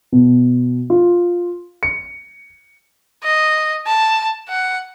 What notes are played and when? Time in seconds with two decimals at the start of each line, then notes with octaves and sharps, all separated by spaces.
0.12 B2
0.90 F4
1.83 C#7
3.23 D#5
3.86 A5
4.49 F#5